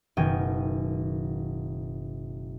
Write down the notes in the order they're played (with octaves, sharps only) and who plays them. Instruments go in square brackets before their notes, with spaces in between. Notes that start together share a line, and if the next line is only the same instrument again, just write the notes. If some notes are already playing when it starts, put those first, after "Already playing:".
[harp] F#1 B2 D#3 G5 G#5 D#7